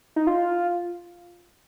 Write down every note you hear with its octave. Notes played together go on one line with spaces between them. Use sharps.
D#4
F4